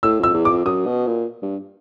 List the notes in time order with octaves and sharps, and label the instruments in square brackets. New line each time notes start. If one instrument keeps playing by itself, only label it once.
[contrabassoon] A2 [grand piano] E6
[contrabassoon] F2 [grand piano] E6
[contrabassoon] E2
[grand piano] D6
[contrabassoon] F2
[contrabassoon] F#2 [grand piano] D#6
[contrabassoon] B2
A#2
G2